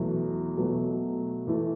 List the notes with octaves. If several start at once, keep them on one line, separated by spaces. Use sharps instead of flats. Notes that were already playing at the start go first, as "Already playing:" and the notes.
Already playing: E2 B2 F#3 A3
B2 F#3 A3
E2 E3 A3